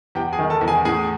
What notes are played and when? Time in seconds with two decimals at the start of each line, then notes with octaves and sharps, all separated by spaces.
0.15 E2 G4 G5
0.33 G#4 G#5
0.39 D#3
0.50 A4 A5
0.61 E2
0.68 G#4 G#5
0.85 A2 G#4 G#5